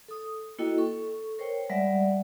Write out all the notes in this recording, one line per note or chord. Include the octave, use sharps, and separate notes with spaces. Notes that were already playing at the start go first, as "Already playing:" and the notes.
A4 D#6
A#3 E4 F#4 A4 D#5 G5
A4 C#6
A#4 C5 C#5 G5
G3 G#3 D5 E5 F#5